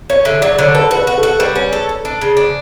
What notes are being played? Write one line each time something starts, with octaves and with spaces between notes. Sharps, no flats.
C#4 C#5
D3 E5
F#3 D5
D3 C#5
A4 B4
F#4 B4
F#4
A4
F#4
G3 B4
C#4
A4
A4
D4
C#3
D4